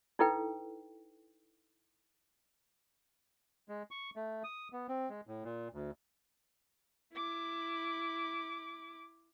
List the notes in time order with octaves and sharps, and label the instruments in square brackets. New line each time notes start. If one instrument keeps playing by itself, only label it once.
[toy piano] D#4 E4 A4 B4 G5
[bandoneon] G#3
C#6
A3
D#6
B3
C4
G#3
A2
A#2
D2
[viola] E4 D6